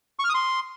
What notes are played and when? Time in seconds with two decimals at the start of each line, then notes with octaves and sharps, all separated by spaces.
0.19 C#6
0.24 F6
0.29 D#6
0.35 C6